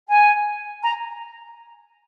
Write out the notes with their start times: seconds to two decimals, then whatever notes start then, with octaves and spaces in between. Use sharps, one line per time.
0.09 G#5
0.83 A#5